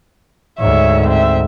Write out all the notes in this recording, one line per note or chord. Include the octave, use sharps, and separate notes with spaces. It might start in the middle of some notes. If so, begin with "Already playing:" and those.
D2 G#2 C#5 E5
C4 E5